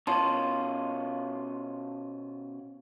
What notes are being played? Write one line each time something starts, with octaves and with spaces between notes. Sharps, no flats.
B2 C#4 F4 A5 C6